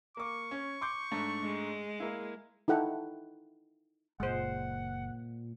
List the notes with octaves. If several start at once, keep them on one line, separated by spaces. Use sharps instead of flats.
A#3 C#6 D6
C#4
C6 D6 G6
G#2 A3 D4
G#3
A#3 E4
D#4 E4 A4 F#5 G5
F#1 A#2 G#3 C5 F#5